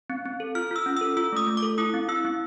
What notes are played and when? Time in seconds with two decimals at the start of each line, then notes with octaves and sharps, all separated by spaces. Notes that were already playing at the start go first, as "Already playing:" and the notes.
0.10 C4
0.25 C4
0.40 A4
0.55 F4 F6
0.71 F4 E6
0.86 C#4
0.97 E6
1.01 A4
1.17 F4 E6
1.32 A3 D#6
1.47 A3
1.57 D6
1.63 A4
1.78 E4 D#6
1.94 C4
2.09 E4 E6
2.25 C4